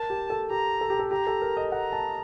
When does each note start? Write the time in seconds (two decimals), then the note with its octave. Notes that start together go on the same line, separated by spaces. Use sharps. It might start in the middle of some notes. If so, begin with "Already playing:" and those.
Already playing: A#4 A5
0.10 G4
0.30 A4
0.50 G4 A#5
0.81 A4
0.90 G4
0.99 A4
1.11 G4 A#5
1.27 A4
1.42 A#4
1.57 D#5
1.72 F#5 A#5
1.93 A5